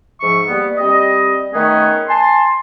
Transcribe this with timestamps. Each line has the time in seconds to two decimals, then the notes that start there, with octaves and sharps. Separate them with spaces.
0.21 G#2 F3 E5 C#6
0.47 G3 A#3 B3
0.77 G3 C4 D#5
1.53 D#3 A3 B3 C#4 G#4
2.08 G#5 A5 C6